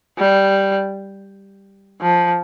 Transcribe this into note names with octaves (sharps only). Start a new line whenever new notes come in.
G3
F3